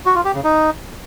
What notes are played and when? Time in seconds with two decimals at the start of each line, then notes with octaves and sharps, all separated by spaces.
0.06 F#4
0.15 F4
0.25 G4
0.34 C#3
0.44 D#4